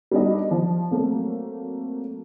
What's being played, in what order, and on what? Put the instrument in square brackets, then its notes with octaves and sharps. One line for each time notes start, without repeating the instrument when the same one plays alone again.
[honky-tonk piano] G3 B3 D4 D#4 D#5
F3
F#3 A3 A#3 C4